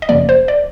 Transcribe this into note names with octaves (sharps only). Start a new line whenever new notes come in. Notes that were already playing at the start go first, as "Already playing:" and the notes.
D#5
F#2 C#3 F3 A#3 D5
C5
D5